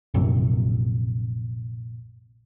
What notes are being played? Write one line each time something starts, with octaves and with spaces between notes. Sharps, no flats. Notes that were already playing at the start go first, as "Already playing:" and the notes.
A#1 F#2 C3